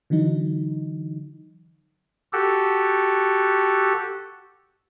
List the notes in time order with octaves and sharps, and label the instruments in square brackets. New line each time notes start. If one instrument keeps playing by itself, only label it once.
[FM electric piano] D3 E3 F#3 D#4
[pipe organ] F#4 G4 A4